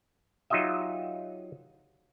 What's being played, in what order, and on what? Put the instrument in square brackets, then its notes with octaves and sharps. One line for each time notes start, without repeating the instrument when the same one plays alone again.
[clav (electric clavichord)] F#3 D#4 F4 G4 D#5 E5